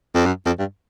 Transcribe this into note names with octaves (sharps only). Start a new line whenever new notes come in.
F2
F#2
F2
G2